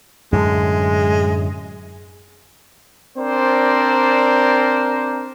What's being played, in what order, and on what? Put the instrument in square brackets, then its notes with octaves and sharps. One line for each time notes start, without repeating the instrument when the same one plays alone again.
[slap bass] F#2 A2 D3 [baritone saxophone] G#3
[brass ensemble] C4 D4 A#4 C5 D5